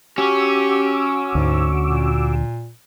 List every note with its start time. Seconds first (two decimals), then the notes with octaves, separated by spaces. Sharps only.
0.18 C#4 F#4 G4 D6 E6
1.35 D2 G#2
1.87 A#2